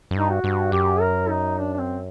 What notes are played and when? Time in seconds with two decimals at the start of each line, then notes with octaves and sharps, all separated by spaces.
0.11 F#2
0.15 G2 D#4
0.30 F#4
0.44 G2
0.72 F#2 G4
1.01 A#4
1.29 D#4
1.58 D4
1.74 D4
1.79 C4